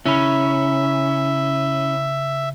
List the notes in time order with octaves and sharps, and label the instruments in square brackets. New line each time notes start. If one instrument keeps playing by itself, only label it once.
[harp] C#3 [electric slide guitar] C#4 [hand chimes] E4 B5 [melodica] E5